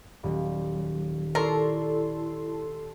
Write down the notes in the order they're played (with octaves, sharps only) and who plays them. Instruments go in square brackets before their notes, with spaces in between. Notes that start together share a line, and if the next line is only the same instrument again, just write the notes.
[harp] D#1 [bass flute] F#3
[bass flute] E4 [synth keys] A4 C6 [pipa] A#4 [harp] C#5 D5